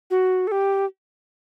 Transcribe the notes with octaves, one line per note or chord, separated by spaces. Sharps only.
F#4
A4
G4